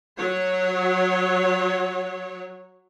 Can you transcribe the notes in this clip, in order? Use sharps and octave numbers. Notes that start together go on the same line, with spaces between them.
F#3 C#5